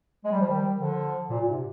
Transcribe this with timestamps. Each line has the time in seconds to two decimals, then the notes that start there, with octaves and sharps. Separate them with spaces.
0.25 G#3
0.32 G3
0.41 F3
0.48 D#3 G3
0.77 D3 F3
1.29 A#2
1.40 A#2
1.47 G#2 C3